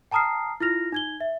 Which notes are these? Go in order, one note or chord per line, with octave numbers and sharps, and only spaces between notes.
G5 A5 A#5 D#6 F6 C7
E4 F4 F6 A#6 F7
D#4 G#6 G7
E5